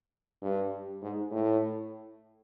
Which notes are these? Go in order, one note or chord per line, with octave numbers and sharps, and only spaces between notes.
G2
G#2
A2